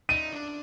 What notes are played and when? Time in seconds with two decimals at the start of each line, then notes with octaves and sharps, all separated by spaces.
0.09 D#4 D#7
0.33 D4